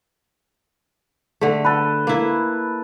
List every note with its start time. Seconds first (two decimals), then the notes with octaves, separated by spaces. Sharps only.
1.41 D3 A3
1.64 A4 B4
2.07 A#3 E4